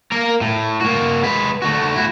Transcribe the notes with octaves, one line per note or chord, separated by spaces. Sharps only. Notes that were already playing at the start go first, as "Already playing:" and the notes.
A#3 A#4
A2
A#3 F#4
G#3 B4
A3 F#4
E4 F#4